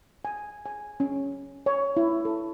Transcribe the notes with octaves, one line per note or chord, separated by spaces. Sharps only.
G#5
G#5
C#4
C#5
E4
A4